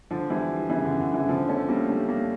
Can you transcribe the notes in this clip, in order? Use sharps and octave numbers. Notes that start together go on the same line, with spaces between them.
D3 F3
E3 G3
C#3 E3
D3
D3
C#3 E3
D3 F3
A3 C#4
G3 A#3
A3 C#4
A#3 D4